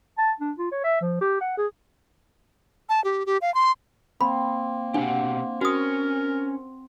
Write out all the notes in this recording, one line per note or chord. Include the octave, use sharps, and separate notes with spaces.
A5
D4
F4
C#5
E5
F3
G4
F#5
G#4
A5
G4
G4
F5
C6
A#3 C4 B5
B2 C4 D4 G4 F#5
C#4 F#4 A#4 D#6